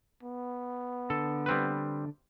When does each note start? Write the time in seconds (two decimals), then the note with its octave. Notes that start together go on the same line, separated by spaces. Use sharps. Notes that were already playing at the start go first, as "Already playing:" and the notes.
0.23 B3
1.10 D3 A4
1.46 G3 C4 B4